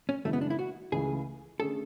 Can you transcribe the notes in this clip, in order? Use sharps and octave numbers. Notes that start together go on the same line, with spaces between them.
C#4
F#2 C#3 E3 G#3 A3
B3
D4
E4
F#4
C#2 C#3 E3 A3 G#4
D3 A3 C#4 G#4 A4